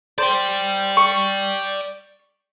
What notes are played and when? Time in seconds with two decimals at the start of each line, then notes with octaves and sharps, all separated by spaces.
0.18 C5 D5 G5
0.97 C#6